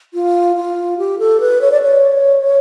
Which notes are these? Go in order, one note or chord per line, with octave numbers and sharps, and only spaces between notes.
F4
F4
G4
A4
B4
C#5
D5
C#5